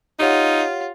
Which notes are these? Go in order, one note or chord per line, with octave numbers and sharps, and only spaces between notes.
D#4 F4 G4 C#5 F#5